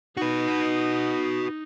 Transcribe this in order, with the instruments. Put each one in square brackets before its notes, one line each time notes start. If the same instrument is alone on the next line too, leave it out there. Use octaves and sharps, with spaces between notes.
[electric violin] D#4 [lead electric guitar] F#4 B4